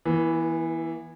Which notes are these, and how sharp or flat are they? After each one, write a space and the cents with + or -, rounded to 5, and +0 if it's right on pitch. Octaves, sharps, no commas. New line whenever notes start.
E3 +0 B3 -40